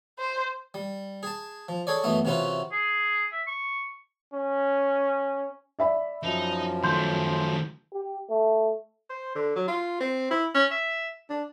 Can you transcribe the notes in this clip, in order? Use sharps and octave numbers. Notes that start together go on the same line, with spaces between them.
C5
G3
G#4 A5
F3
G#4 A4 C#5 D5
F#2 E3 A3 B3 D#5
C3 E3 C#4 F4 F#4 B4
G#4
E5
C#6
C#4
D5 E5 B5
F#2 F3 D#4
D#3 A3 C6 G6
G4
A3
C5
D3
F#3
F4
C4
E4
C#4
E5
D4